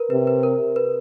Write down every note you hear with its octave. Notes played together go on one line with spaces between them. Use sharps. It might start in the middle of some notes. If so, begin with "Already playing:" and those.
Already playing: A#4 B4
C3 B4
B4
A#4
B4